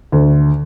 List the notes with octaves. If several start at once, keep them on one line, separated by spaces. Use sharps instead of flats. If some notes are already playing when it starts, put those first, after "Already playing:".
D2